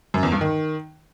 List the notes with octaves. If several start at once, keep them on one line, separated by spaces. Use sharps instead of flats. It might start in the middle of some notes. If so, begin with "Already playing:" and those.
F#2
E2
G2
D#3